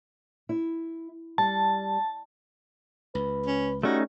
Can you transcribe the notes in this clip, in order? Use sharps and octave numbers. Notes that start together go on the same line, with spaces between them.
E4
G3 A5
C#2 B4
C#4
G3 A3 C#4 D#4 F#4